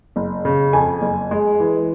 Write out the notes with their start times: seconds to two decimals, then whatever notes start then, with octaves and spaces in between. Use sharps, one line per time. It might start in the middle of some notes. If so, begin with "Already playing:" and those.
0.16 F#1
0.45 C#3
0.73 F2 G#5
1.02 F#1
1.31 G#3
1.60 E3